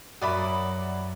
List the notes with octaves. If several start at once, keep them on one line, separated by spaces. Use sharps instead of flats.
F#2 F#4 D5 E5 B5 D6 D#6